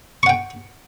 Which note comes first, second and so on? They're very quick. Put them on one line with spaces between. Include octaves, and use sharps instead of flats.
C#6 F#5 G5